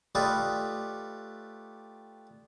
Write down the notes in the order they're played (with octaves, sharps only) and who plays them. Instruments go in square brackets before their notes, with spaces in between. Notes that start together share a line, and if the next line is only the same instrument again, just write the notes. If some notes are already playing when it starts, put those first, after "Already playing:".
[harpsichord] A3 F4 G4 B4 D5 D#5